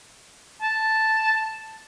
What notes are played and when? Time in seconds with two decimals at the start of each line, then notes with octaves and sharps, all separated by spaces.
0.62 A5